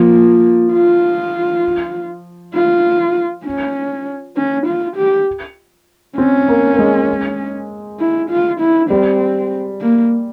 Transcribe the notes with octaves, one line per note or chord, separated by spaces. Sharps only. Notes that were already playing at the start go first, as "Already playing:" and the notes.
Already playing: F3 A#3
F4
F4
C#4
C#4
F4
G4
C4 C#4
A#3
A#3
G#3
E4
F4
E4
G3 C4
A#3